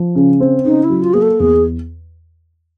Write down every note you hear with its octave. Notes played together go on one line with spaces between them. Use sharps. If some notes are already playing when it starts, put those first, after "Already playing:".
Already playing: F3
C#3
C4
C#3 D#4
E4
F#3
F4
A#3 G#4
A4
E2 G#4